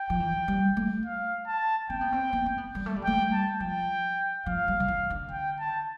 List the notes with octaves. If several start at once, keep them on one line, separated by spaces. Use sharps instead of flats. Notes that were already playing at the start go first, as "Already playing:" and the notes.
Already playing: G5
F3
E3
G3
A3
F5
A5
C4 G5
B3
C4
B3
C4
B3
G3
A3
G3
A3 G5
G3
A5
F3 G5
F3 F5
G3
D3
E3
D3
G5
A5